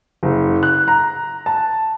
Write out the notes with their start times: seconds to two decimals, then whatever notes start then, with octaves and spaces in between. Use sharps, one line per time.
0.23 F#1
0.63 F#6
0.88 A#5
1.46 A5